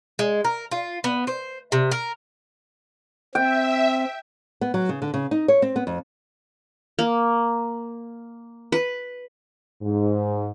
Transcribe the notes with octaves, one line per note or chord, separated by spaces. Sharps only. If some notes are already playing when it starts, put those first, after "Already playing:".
G#3
A#4
F4
B3
C5
C3
A#4
C4 E5 G5
B3
F#3
C#3
D3
C#3
D#4
C#5
C4
B3
F2
A#3
B4
G#2